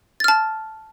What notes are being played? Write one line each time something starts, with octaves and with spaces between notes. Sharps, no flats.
A5 F6 A6